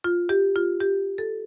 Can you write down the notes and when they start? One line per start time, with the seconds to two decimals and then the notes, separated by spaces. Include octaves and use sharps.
0.04 F4
0.29 G4
0.56 F4
0.80 G4
1.18 A4